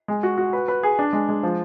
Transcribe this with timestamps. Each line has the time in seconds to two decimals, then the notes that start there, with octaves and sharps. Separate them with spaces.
0.08 G#3
0.23 F#4
0.38 F#4
0.53 B4
0.68 B4
0.83 G#4
0.99 D4
1.13 G#3
1.29 G#3
1.43 F3